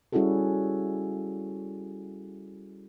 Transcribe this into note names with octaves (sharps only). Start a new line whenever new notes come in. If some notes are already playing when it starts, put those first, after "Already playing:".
G3 C#4 E4 F#4 G#4 A4